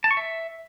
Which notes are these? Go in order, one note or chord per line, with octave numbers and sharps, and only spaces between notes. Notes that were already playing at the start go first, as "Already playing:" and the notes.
A5
C#6
E5